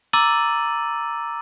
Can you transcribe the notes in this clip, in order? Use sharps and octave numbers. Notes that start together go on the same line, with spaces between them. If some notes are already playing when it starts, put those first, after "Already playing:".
A#5 D6 E6 A6 D#7 F#7